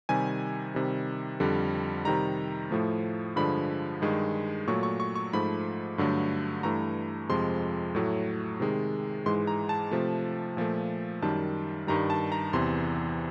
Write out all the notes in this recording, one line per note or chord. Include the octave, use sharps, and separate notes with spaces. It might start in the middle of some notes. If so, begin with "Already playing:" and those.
C3 D#3 G3 G#5
C3 D#3 G3
F2 D3 G3
C3 D#3 G3 A#5
A2 F3 A3
G2 D3 F3 G#3 B5
G2 D#3 G#3
A#2 F#3 A3 C#6
C#6
C#6
C#6
G#2 F3 A3 B5
G2 D3 F#3 A3
G2 E3 A3 A#5
F2 C3 F3 G#3 C6
A2 F#3 A3
C3 D#3 G#3
G#2 E3 G#3 C6
A#5
A5
C3 F3 A3
A#2 F3 A3
F#2 D#3 G3 A5
G2 D#3 G3 A#5
A5
A#5
E2 C3 E3 C6